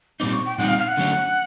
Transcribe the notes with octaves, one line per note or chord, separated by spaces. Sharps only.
A#2 G3 C4 D#4 D6
C#6
G5
A#2 G3 C4 D#4 F#5
F5
F5
F#5
D3 F#3 A3 C#4